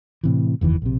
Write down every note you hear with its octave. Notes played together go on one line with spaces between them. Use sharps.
A2 C3 E3
F#1 E2 D#3 E3
A#1 C3